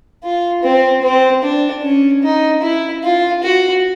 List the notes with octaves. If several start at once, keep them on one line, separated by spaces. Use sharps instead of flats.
F4
C4
C4
D4
C#4
D#4
E4
F4
F#4